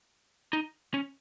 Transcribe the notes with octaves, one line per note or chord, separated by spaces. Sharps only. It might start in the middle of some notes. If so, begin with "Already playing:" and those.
D#4
C#4